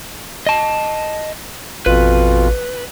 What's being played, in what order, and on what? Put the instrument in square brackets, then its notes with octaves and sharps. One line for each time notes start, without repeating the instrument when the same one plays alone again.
[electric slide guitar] D#5 A5
[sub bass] A1 [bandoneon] F2 B2 F4 [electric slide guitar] B4